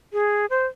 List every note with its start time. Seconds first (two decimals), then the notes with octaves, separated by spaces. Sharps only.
0.13 G#4
0.50 C5